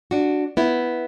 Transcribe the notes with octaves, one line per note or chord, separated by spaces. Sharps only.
D4 F#4
B3 E4